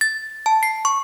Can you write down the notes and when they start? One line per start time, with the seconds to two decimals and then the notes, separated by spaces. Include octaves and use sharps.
0.01 A6
0.46 A5
0.63 C7
0.85 C#6